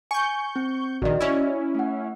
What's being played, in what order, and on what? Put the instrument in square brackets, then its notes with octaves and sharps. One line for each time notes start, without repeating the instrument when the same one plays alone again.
[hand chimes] G#5 [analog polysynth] C#6 G6
[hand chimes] C4
[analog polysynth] A#1 D#3 [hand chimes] F#4 D5 D#5
[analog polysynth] C#4 E4
[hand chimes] A3 F#5